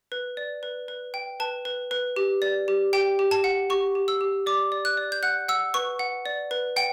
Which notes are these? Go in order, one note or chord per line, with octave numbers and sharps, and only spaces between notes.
B4
D5
B4
B4
G5
B4 A5
B4
B4
G4
D5
G4
G4 G5
G4
A5
F#5
G4 C#6
G4
E6
G4
D5 D6
D5
F#6
D5
G6
F#5 F#6
F#5 E6
B4 C#6
F#5
D5
B4
F#5 G5